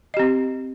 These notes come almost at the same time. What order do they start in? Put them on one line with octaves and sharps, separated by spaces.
D#5 G4 C4